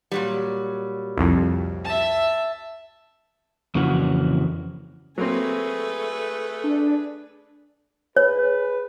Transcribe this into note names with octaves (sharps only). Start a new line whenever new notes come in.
A#2 F#3 G3
C2 F2
E5 A5
F2 C#3 E3 A#3 F#4
F#3 A3 A#3 C4 G#4 B4
D4
G#4 B4 C#5